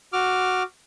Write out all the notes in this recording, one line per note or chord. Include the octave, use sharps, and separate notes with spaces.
F#4 D6 F6